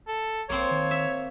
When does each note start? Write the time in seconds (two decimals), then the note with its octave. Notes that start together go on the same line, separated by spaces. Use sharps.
0.08 A4
0.49 A#1 A#3 C4 C5 C#5
0.71 D#3
0.91 E5